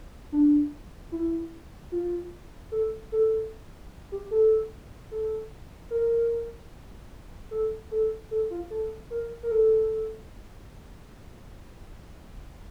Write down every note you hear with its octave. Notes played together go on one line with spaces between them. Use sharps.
D4
E4
F4
A4
A4
G4
A4
A4
A#4
A4
A4
A4
F4
A4
A#4
A#4
A4